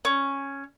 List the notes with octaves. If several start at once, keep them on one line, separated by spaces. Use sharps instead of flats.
C#4